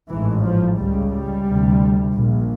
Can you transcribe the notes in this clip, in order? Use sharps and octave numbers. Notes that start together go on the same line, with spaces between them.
A1 G#2 E3
F3
C#2 C#3 G3
G3
D2 C3
A#1 A#2